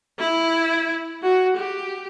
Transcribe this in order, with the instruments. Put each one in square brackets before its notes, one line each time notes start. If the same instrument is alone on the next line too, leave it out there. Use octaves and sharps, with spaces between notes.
[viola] E4
F#4
G4